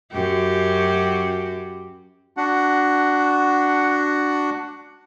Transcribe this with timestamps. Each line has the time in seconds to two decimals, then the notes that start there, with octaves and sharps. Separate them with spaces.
0.12 F#2 F#4 G4
2.37 D4 F#4 F#5